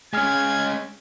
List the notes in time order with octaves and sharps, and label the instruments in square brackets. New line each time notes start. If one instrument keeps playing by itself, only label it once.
[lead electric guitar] G#3 C#4 [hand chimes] G#5 F6 [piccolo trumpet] G#6